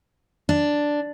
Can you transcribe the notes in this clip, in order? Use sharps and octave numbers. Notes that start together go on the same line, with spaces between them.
D4